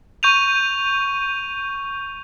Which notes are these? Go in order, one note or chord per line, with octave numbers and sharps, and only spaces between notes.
C#6 G6 D#7 F7